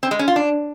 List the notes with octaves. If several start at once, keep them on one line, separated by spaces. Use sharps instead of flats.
C4
G#3
C#4
F4
D4